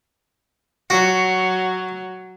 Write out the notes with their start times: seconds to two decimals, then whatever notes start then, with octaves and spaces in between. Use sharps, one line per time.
0.90 F#3 F#4